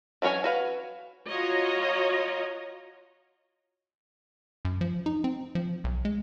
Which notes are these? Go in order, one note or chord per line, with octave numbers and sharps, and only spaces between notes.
E3 F#3 C#4 C#5 G#5
F#4 B4 F5
F4 F#4 C#5 D#5 A#5
F#2
F3
D#4
C4
F3
B1
G#3